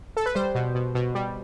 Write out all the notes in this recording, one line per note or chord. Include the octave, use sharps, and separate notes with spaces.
A4
B4
G3 C5
B2
B2
B2
G3